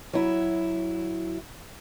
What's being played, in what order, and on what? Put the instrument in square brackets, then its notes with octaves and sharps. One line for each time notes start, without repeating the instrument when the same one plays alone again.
[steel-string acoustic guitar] F#3 E4